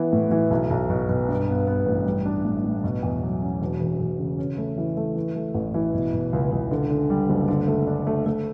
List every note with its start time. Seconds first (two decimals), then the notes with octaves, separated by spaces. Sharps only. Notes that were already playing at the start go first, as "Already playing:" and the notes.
Already playing: E3 B3
0.13 A2
0.31 E3
0.51 B1
0.71 B1
0.90 B2
1.09 B2
1.29 G2
1.48 B3
1.67 B3
1.86 A1
2.06 G3
2.26 D4
2.45 A2
2.64 A2
2.84 B2
3.03 E2
3.22 F#3
3.42 C#4
3.61 E1
3.81 E1
4.00 E1
4.19 C#3
4.38 C#4
4.58 A3
4.78 E3
4.97 A3
5.16 E3
5.36 A3
5.55 A1
5.74 E3
5.94 B2
6.13 B2
6.33 C#2
6.52 C#2
6.71 D3
6.90 D3
7.10 G3
7.30 F#1
7.48 D3
7.68 A3
7.87 D4
8.07 A3
8.26 A3